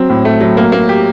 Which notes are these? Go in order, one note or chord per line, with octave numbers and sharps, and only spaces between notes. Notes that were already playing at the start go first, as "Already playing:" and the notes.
Already playing: F#3 C4
A2
A3
F#3
A#3
A#3
G4